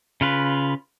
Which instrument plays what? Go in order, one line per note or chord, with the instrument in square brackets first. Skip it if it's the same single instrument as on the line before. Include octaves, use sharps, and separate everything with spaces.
[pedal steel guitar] C#3 F4 B4